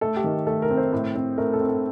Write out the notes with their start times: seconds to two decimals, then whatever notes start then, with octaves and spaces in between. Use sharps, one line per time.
0.01 A3 A4
0.16 G4
0.24 D#3
0.47 A3 A4
0.62 A#4
0.70 C4
0.77 C5
0.92 A2
1.15 C4
1.38 A3 A#4
1.53 A4
1.61 C4
1.68 A4